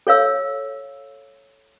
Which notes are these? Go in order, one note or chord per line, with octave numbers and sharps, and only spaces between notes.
A4 C#5 F5 E6